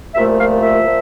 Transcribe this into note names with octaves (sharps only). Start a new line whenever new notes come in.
C2 A#2 F3 A3 E5
F5
E5
A#2 F3